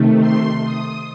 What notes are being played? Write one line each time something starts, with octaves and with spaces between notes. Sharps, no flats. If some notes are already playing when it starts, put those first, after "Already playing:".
Already playing: C3 D#3 A3
C6
D#6